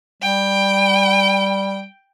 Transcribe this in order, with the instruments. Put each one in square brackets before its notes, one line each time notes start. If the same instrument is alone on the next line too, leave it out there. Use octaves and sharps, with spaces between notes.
[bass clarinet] G3 [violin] G5